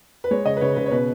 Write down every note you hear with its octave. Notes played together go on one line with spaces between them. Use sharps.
B4
G#3 C#5
C#3 D#5
B4
C#3 C#5
C#3 B4
C#5
B2 B4